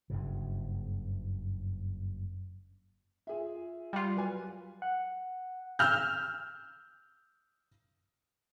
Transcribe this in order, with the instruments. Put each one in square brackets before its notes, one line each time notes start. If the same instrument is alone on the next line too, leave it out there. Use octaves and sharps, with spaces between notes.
[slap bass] F#1 G2 C#3
[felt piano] F4 G#4 E5
[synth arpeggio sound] G3 F4
[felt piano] F#3 B4 G#5
[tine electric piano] F#5
[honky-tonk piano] E6 F6 G6